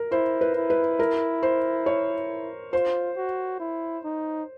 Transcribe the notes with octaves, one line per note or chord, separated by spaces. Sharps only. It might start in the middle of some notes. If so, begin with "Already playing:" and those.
Already playing: A#4
E4 C5
B4
E4
B4
A#4
C5
C#5
F4 C5
F#4
E4
D#4